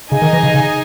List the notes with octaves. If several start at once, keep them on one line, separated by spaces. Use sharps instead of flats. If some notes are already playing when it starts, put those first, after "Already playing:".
C#3 D#4 G#4 D#5 G#5
D#3
E3
C#3
C#3